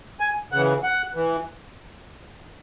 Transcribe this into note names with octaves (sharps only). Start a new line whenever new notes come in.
G#5
C#3 E3 F#5
F#5
E3